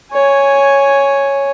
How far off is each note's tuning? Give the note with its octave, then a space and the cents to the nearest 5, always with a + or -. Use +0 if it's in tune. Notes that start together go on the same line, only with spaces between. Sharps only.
C#5 +0 G#5 +0